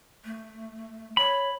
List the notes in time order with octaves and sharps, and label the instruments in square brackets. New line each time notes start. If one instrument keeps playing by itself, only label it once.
[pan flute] A3
[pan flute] C#5 [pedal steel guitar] B5